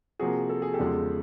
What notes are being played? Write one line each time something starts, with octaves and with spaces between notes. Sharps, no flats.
C3 F3 A#3 F#4 G#4
A4
G#4
G4 A4
E2 C#3 F3 G#3